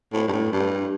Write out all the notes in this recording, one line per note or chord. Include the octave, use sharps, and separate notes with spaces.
A2
G2
A2
G2